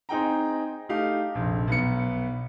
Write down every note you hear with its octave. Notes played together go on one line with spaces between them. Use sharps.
C4 D#4 G#4 G5 A#5
A3 D#4 G4 F5
F1 A#1
B1 B3 C#7